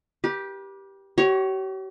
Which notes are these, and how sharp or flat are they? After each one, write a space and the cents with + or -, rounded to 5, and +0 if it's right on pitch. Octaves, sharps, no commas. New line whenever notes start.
G4 +0 B4 -40
G4 -45 C#5 +0